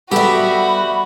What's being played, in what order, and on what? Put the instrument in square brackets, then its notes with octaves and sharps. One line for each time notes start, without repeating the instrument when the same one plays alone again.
[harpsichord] G3 B3 A4 [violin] F#4 [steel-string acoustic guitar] G4 E5 [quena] B5